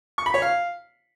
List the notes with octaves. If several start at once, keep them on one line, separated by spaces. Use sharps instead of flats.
C#6
B5
C#5
F5